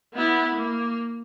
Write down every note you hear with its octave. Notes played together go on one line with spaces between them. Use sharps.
B3 E4
A#3